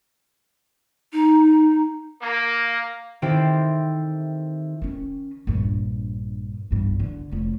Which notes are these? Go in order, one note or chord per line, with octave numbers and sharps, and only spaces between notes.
D#4
A#3
D#3 C4 E4 G4 A4 C5
D#3 C#4
A#1 G2
B1 G2
D3
F1 F#3